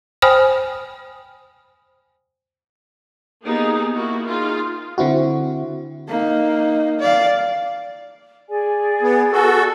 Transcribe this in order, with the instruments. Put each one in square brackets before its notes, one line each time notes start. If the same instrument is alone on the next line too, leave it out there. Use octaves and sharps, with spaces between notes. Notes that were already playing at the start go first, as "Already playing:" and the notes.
[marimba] C5 G5 G#5 B5 D#6 F6
[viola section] A#3 B3 D#4 G4 G#4
A#3 E4 F#4
D#4 F4 G#4
[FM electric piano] D3 C4 E4 F#4
[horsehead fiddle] A#3 D#4
D5 F5
[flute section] G#4 D5 G#5
[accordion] B3
F#4 A4